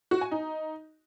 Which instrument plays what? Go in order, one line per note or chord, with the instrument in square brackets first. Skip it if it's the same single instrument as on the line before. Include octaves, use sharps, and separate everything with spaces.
[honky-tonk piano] F#4
G#5
D#4